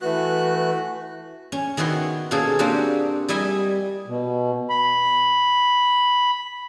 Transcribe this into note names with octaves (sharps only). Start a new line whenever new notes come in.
E3 A3 F#4 B4 F#6
C#4
D#3 B3 E4 F#4 C6
B2 A#3 C#4 G#4 A4
A#3 C4 D4 F#4 G4
G3 E4 D#5 E5 G#5
B2
B5